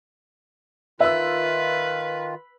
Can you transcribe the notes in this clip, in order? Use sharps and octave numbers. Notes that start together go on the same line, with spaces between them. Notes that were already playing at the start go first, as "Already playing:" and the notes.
D#3 F4 B4 E5 E6